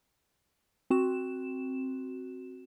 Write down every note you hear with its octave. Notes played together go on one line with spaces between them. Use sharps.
C4 F#4 E7